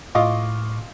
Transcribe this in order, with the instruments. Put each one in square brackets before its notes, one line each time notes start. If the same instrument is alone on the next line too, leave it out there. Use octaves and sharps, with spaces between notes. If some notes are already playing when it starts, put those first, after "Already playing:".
[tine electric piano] A2 C#6 D6 [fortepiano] F4 D#5 F5